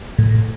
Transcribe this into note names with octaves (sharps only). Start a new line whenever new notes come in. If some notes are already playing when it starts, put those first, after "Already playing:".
A2